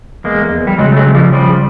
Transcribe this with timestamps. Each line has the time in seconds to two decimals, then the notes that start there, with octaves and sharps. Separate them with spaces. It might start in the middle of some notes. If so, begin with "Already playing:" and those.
0.24 E2 G#3 A#3
0.52 E2
0.67 G3
0.78 C#3 F#3 G#3
0.92 A3
0.97 F#3 G#3
1.06 C#3
1.15 F3 G3
1.33 C#3 F3 G3